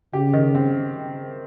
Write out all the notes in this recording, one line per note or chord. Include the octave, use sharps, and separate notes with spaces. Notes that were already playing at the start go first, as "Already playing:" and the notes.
C#3 G4
D#3
C4